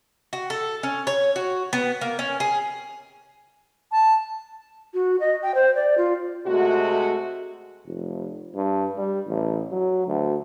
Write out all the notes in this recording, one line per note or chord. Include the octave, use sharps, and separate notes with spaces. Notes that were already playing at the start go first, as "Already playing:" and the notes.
F#4
A4
C#4
C#5
F#4
B3
A#3
C#4
G#4
A5
F#4
D#5
G5
C5
D5
F4
C3 G#3 A3 F#4
F1
G2
G3
A1
F#3
D2